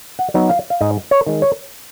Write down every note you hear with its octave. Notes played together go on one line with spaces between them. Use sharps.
F#5
F#3 B3 D#4
F5
F5
G#2 D#5
C#5
D#3 G#3
C#5